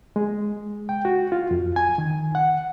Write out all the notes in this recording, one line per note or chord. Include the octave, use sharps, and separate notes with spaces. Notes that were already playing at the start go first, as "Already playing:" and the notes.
G#3
G5
F#4
F4
F2
G#5
D#3
F#5